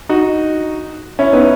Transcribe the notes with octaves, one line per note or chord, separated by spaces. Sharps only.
D#4 F#4
C#4 E4
B3 D#4